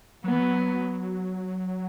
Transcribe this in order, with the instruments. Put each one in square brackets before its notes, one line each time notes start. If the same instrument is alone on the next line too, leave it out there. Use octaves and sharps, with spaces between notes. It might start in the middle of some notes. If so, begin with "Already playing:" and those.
[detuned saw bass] F#3 [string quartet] B3
[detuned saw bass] E3
F#3